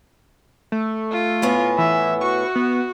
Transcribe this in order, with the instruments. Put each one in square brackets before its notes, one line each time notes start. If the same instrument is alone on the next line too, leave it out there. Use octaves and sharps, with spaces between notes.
[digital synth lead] A3
[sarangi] F4
[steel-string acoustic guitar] A2 B3 G#5
[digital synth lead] E3 [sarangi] E5
[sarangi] F#4 [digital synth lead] C#6
[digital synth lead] B3